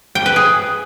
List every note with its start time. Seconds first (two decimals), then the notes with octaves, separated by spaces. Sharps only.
0.15 G5
0.26 B4
0.36 G#4